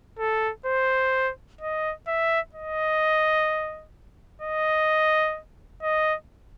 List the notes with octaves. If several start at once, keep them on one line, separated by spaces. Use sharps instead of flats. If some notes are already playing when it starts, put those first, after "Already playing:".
A4
C5
D#5
E5
D#5
D#5
D#5